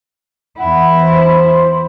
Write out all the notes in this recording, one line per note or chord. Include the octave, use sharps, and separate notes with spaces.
E2 E4 F#5
C5